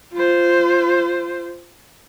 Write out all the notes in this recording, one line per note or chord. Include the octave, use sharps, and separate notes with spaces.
F4 C5